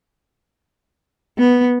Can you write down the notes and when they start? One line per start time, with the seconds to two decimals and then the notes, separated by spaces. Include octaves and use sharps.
1.38 B3